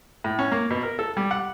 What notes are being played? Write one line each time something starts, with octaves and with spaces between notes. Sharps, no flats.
A2
C#4
A#3
B2
A#4
A4
G3
F#5